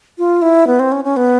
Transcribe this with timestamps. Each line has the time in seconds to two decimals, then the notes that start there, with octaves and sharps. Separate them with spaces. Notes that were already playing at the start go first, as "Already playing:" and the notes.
0.18 F4
0.42 E4
0.67 B3
0.79 C4
0.92 C#4
1.04 C#4
1.17 B3